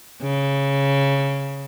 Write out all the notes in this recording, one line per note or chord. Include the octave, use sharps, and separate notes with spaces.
C#3